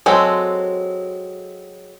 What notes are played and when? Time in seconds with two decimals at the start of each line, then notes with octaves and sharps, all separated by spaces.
0.06 F#3 G#3 C4 A4